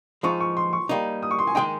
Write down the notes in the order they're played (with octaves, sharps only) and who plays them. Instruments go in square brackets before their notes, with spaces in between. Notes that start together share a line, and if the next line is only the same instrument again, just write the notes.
[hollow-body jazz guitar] F3 G#3 D#4 [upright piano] C#6
[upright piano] C#6
C6
C#6
[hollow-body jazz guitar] G3 A#3 D#4
[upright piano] D#6
C#6
C6
G#5
[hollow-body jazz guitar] D#3 G#3 D#4 [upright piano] G5